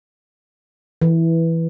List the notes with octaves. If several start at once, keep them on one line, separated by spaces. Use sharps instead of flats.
E3